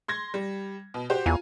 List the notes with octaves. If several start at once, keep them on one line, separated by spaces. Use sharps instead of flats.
C6 G#6 A#6
G3
B2
F#4 G4 C5
E2 F4 G#5 A#5